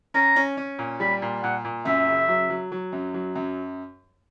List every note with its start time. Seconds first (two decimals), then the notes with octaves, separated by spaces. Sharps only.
0.14 C#4 A#5
0.36 C#4
0.57 C#4
0.78 A#2
1.00 G3 B5
1.22 A#2
1.42 A#2 F#5
1.64 A#2
1.85 F#2 E5
2.07 C#3
2.28 F#3
2.50 F#3
2.72 F#3
2.92 F#2
3.14 F#3
3.35 F#2